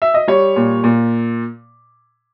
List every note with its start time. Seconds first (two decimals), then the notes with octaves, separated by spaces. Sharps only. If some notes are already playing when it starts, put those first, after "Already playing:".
0.02 E5
0.14 D#5
0.28 G3 C#5
0.56 A#2
0.84 A#2